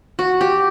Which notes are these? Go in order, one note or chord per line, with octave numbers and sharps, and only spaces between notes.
F#4
G4